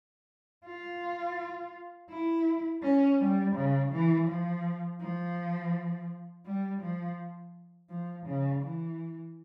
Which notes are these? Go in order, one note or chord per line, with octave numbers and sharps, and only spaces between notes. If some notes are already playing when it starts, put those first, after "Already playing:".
F4
E4
C#4
G3
C#3
E3
F3
F3
G3
F3
F3
C#3
E3